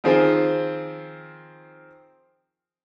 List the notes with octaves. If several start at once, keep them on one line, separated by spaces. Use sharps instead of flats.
D#3 F3 C4 F4 G#4 C5